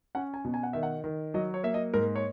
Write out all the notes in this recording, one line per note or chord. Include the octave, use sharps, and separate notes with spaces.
C#4 F#5
G#5
B2
G#5
F#5
D#3 E5
F#5
D#3
F#3 D#5
C#5
A#3 E5
D#5
G#2 A#4
C#5